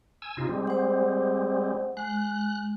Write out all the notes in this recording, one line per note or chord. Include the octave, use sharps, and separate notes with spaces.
G#5 E6
C3 D#4 F4
G3 G#3 C4
C5 F#5
G#3 F#6